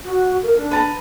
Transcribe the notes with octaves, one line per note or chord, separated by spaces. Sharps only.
F#4
A#4
D4
B4 A5 A#5